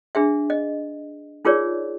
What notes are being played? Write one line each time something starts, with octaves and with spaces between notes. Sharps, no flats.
D4 G#4 E5
D#5
D#4 F4 G#4 A#4 C#5 D5